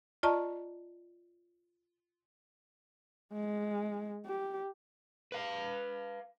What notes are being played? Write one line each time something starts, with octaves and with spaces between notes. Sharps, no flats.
F4 D5 D#5 A5 A#5 C#6
G#3
G4
B4 F5